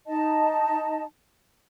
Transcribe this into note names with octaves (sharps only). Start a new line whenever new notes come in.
D#4 D#5 A5